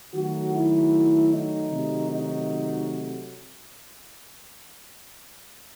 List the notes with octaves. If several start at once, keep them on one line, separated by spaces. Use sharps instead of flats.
D#3 F#3 A3 F#4
E4
D#4
C3 D#3 F#3 A3
D#4